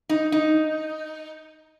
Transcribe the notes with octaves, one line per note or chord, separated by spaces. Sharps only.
D#4
D#4